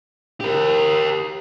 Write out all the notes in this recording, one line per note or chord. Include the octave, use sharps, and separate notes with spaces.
G4 A#4